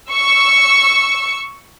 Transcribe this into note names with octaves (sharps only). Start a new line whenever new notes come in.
C#6 E6